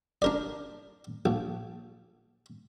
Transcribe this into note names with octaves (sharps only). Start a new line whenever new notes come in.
D4 A#4 D5
A#1